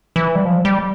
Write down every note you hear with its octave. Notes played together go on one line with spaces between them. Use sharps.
E3
G3
F3
G3